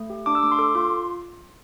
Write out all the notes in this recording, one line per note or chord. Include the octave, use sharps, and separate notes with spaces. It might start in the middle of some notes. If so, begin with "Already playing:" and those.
Already playing: A3
G4
D4 D6
E6
A3 D6
C6
A4 D6
F4 C6